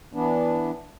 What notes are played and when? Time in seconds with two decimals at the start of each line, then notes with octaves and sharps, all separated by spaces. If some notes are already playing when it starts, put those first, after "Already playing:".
0.13 E3 B3 D4